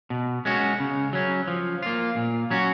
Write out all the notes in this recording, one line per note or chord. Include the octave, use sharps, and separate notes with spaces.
B2
G#3 C#4 F#4
C#3
F#3 C#4
F3
A#3 F4
A#2
F#3 C#4 F#4